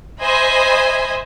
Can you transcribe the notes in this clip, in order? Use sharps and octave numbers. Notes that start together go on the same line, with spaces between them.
C5 D#5 E5 G#5 B5